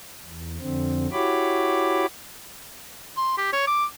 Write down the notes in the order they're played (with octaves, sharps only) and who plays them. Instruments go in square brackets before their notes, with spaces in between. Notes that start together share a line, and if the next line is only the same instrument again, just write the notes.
[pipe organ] E2
F2 D3 C4
E4 F#4 G4 C#5 B5 D6
[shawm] C6
G4
C#5
D6